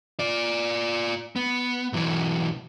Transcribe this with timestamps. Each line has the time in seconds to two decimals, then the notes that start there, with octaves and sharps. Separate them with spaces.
0.19 F4 D5
1.36 B3
1.93 B1 E3